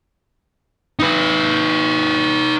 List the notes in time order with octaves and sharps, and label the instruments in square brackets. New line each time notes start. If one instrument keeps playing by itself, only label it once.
[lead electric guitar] D#4 B4